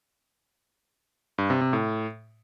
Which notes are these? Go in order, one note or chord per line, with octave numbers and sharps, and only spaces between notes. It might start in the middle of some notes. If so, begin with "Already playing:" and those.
G2
C3
C3
A2